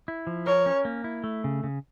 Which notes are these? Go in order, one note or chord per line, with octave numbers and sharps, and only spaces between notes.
E4
F3
A#4 C#5
C#4
A#3
E4
A3
C#3
C#3